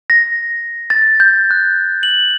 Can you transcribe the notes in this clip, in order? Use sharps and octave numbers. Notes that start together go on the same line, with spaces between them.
A#6
A6
G6
F#6
F#7